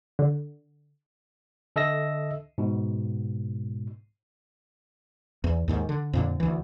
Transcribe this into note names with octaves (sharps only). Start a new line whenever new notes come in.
D3
D3 A4 D#5 E5 E6 A#6
G#2 B2
E2
D#2 G#2 D#3
D3
F2 A#2 D3
D2 E3